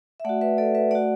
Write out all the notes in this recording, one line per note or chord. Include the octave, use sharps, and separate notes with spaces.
E5
A3 F#4 D5 F#5
B4 E5
A4 D5
B4 E5
A3 F#4 D5 F#5